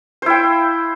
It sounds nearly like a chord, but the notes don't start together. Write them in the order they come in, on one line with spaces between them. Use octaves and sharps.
C5 E4 G5